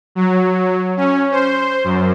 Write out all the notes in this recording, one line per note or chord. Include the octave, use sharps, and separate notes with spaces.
F#3
C#4
C5
F#2